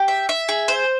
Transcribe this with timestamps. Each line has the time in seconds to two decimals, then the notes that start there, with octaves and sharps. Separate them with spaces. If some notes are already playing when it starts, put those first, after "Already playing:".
Already playing: G4
0.08 E5
0.29 E5
0.49 G#4
0.68 C5